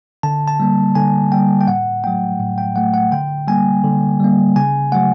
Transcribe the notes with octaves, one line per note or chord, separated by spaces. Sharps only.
D3 A5
A5
G3 A#3
D3 G#5
G3 A#3 G5
G5
A2 F#5
F#3 A3 G5
A2
G5
F#3 A3 F#5
F#5
D3 G5
G3 A#3 G#5
D3
G3 A#3
C#3 G#5
F#3 A3 F#5